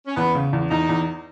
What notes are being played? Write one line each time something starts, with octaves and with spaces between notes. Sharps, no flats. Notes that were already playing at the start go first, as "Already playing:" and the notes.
C#4
E2 B3
C#3
E2
E2 D#4
E2